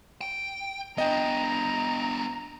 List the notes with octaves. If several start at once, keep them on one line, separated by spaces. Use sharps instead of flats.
G5
B3 D4 D#5 G5 A#5